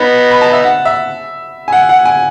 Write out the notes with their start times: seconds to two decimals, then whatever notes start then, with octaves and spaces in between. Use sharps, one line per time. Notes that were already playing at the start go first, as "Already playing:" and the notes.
Already playing: B3 D#4 B5
0.30 B5
0.41 A5
0.52 E5
0.64 F#5
0.85 E5
1.68 G#5
1.72 F#5
1.89 F#5
2.05 G#5